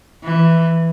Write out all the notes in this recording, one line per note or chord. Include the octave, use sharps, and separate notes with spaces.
E3